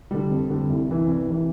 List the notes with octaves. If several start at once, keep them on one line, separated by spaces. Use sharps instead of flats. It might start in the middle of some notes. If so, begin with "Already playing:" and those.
D3 G3
F2
D3 G3
C2
C3 E3
C2
C3 E3